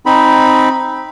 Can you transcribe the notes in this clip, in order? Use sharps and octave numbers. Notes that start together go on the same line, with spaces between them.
C4 D#4 B5